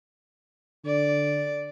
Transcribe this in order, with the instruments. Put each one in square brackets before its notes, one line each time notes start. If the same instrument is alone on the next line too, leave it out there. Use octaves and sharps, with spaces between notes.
[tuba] D3 [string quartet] D5